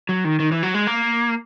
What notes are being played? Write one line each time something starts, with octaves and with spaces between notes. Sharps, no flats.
F#3
D#3
D#3
E3
F#3
G#3
A#3